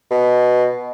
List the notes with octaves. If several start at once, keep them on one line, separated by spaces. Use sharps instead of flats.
B2